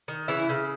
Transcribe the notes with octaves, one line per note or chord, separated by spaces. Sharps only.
D#3
C#3 E3 E4
C#3